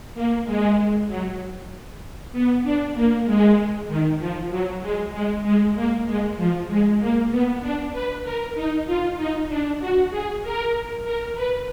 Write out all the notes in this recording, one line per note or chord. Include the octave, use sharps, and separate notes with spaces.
A#3
G#3
F#3
B3
D4
A#3
G#3
D#3
F3
F#3
G#3
G#3
G#3
A#3
G#3
F3
G#3
A#3
B3
D4
B4
A#4
D#4
F4
D#4
D4
F#4
G#4
A#4
A#4
B4